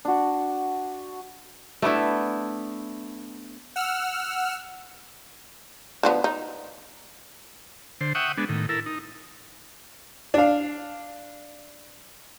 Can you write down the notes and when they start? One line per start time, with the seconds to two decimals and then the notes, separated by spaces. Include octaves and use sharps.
0.05 D4 F#4
1.82 A3 B3 D4 E4
3.76 F#5 E6 F6
6.03 D3 F3 B3
6.24 D#4
8.01 D3 C5
8.15 E5 F#5 G5 C#6 D#6
8.38 G#3 B3 D4
8.49 A2 D#3
8.69 E4 A4 A#4
8.86 D#4
10.34 D4 F5